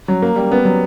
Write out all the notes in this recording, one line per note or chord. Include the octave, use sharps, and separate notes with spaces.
F#3
A#3
G3
B3
F#3